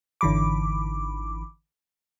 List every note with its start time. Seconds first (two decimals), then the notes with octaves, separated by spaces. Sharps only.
0.21 G#1 D3 E3 B5 D6